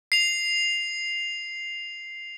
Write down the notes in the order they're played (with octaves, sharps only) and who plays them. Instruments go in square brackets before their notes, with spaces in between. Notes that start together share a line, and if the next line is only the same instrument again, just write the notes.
[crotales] C7 F7